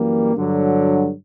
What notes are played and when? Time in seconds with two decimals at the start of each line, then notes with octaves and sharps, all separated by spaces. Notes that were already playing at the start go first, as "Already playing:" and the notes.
Already playing: F#2 E3 G3 A#3
0.36 G2 D3 F#3